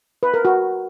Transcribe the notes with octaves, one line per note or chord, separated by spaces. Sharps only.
B4
A#4
F#4